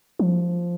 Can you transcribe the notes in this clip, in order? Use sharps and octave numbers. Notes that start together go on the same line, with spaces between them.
F3